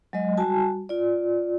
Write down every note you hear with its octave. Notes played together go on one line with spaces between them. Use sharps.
F#3 G#3 D#5
G3 F#4 G#5 A5
F4 D5